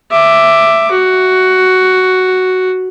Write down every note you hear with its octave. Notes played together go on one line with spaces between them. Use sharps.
E5 D6
F#4